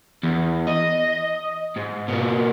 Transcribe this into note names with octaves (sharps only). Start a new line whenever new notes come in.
E2
D#5
G#2
B2 A#3